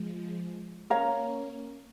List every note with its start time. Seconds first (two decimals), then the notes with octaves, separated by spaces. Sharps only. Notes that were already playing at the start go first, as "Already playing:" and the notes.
Already playing: F3 G#3
0.90 A#3 C#4 A#4 C#5 F5 A#5